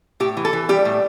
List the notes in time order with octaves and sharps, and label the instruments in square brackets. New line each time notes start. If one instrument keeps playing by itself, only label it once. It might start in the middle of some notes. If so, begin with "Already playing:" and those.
[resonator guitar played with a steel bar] A2 G4
E3
A4
E3
G3 G4
A2